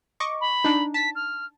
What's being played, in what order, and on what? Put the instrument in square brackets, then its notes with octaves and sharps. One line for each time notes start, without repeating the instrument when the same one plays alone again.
[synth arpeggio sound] D#5 C#6 D6
[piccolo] B5
[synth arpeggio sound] D4 D#4
[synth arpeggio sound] A5 [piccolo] B6
[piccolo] F6